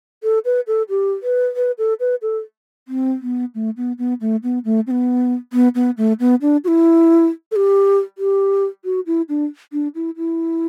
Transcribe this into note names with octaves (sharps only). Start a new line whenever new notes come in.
A4
B4
A4
G4
B4
B4
A4
B4
A4
C4
B3
A3
B3
B3
A3
B3
A3
C4
B3
B3
B3
A3
B3
D4
F#4
E4
A4
G4
G4
F#4
E4
D4
D4
E4
E4